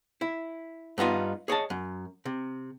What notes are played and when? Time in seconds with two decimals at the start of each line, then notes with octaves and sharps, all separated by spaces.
0.21 E4
0.98 G2 B3 D#4 F4
1.48 G#4 C#5 D#5 A5
1.70 F#2
2.25 C3